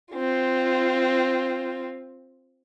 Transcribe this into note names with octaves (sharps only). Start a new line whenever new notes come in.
C4 F4